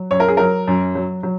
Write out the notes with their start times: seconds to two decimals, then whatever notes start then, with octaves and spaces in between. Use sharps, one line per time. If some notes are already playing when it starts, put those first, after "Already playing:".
Already playing: F#3
0.11 F#2 C#5
0.20 A#4
0.28 G#4
0.37 F#3 A#4
0.68 F#2
0.95 F#3
1.23 F#3